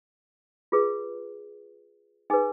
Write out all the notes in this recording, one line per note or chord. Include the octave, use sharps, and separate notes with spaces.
F4 G#4 B4
D#4 G#4 B4 G#5